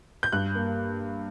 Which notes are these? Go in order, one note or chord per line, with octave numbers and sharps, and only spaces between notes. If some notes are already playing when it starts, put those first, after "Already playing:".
G6
G2 F#6
A#3